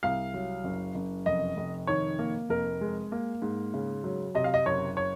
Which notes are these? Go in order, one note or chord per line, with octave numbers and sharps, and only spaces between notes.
C2 F5
F#3
F#1
F#1
F1 D#5
F1
D#3 C#5
A#3
F1 A#4
G#3
A#3
G#2
C#3
F#3
C3 D#5
F5
D#5
F#1 C#5
C#5